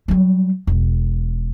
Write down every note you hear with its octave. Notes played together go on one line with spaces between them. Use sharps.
F#3 G3
E1